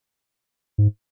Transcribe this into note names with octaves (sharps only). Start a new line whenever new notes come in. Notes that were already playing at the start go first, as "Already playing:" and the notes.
G#2